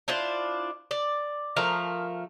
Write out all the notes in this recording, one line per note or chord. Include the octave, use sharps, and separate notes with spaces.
D4 E4 F4 C5
D5
F3 A3 A#4 F5